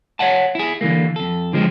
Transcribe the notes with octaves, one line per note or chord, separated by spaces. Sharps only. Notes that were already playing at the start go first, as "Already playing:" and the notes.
C#5 E5 F#5 A5
E4 G#4
D3 E3 A3 A#3
F2 A4
D3 F3 G#3 C4